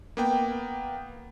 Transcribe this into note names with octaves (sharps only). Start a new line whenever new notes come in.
A#3 B3 G5